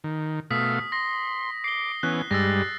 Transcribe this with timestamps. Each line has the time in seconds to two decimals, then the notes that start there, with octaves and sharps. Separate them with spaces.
0.04 D#3
0.51 B2 A3 F5 D#6 B6
0.92 C6 A#6
1.64 D6 C7 G7
2.03 E3 B3 C#4 F#6
2.31 G2 G3 G#3 E6 A6 A#6